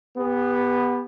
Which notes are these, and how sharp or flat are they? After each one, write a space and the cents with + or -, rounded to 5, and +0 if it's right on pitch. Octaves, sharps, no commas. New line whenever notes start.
B3 +0 G4 +35